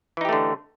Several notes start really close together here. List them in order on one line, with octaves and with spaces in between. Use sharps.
E3 D#4 G4 A3 D3